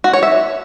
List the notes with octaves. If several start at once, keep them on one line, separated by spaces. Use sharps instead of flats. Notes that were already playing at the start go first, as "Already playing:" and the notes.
F#4
C#5
E5